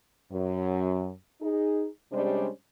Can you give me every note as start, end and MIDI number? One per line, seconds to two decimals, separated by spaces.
0.31 1.09 42
1.41 1.86 63
1.41 1.86 68
2.12 2.48 48
2.12 2.48 55
2.12 2.48 56
2.12 2.48 61
2.12 2.48 62
2.12 2.48 72